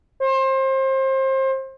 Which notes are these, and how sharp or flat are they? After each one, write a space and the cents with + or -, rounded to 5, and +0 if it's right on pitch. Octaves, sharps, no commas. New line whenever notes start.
C5 +30